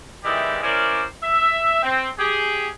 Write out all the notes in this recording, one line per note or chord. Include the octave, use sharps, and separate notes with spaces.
D#3 E3 G#3 E4 G4 D5
C#4 E4 A#4 C5 D5
E5
C4
G4 G#4